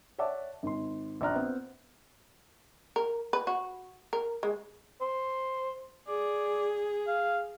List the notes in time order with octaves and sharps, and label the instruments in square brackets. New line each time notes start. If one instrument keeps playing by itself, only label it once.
[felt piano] C#5 D5 E5 F#5 A5 D6
G#1 C6
A#1 D5 A#5 F6 F#6
B3 C4 C5
[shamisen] A#4
B4
F#4
A#4
G#3
[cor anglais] C5
[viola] G#4 [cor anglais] D5
[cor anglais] F5